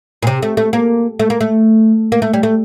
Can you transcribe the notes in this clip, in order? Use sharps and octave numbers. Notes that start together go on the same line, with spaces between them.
A#2
C3
A3
A3
A#3
A3
A#3
A3
A#3
A3
G3
A3